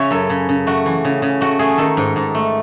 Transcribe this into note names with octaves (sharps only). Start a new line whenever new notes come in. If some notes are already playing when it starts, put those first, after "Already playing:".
Already playing: C#3 C#5 E5
F#2 A4
C#3
C#3
A3 F#4
E3
C#3
C#3
A3 F#4
A3 G#4
D#3 A4
G#2
G#2
A3